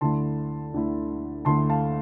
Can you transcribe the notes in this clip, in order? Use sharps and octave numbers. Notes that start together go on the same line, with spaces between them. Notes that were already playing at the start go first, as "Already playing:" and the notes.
D2 D3 A3 E4 A5 C6
D2 D3 A3 E4
D2 D3 A3 E4 A5 C6
F5 A5